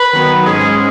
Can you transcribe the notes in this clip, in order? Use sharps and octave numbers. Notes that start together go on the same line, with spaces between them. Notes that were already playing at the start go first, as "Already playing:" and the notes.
Already playing: B4
D#3 F#3 B3
G#2 G#3 C#4 G#4